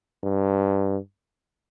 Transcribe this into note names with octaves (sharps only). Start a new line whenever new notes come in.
G2